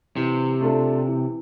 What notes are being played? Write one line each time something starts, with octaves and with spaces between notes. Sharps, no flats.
C3 E3
A3 D4 F4 A4
E3